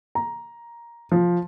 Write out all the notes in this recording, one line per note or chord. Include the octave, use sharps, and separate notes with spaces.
A#5
F3